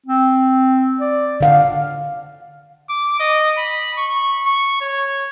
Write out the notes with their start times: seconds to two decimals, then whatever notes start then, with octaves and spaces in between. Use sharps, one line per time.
0.07 C4
1.01 D5
1.41 D3 F5 F#5
2.89 D6
3.20 D#5
3.58 B5
3.98 C#6
4.47 C#6
4.81 C#5